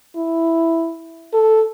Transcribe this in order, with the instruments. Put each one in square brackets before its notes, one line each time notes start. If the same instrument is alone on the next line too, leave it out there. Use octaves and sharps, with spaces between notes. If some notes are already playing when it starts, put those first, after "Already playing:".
[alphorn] E4
A4